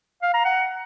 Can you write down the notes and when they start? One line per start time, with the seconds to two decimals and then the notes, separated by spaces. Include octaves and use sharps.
0.22 F5
0.34 A#5
0.45 F#5